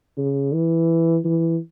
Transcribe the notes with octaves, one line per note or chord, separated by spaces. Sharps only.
C#3
E3
E3